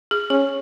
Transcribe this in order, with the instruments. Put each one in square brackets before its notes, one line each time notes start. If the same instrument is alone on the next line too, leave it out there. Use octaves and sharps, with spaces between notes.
[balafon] G#4
[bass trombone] C#4 [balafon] G#4